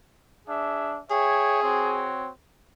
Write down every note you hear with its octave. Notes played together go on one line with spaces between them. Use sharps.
D4 G#4 E5
G#4 C#5 E5 G5
C4 F#4 C#5